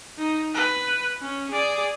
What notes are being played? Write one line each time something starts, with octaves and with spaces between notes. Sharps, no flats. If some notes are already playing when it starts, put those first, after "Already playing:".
D#4
B4
C#4
G#4 D5